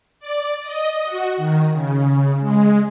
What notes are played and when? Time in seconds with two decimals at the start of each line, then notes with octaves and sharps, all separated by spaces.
0.19 D5
0.62 D#5
1.05 F#4
1.37 D#3
1.71 C#3
2.40 G#3